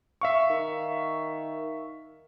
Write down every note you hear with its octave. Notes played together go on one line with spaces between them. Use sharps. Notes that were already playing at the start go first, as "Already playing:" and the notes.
E5 F5 C#6
D#3